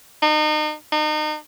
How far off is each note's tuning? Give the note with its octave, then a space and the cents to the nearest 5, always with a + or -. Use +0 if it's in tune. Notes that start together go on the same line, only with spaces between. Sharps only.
D#4 -35
D#4 -35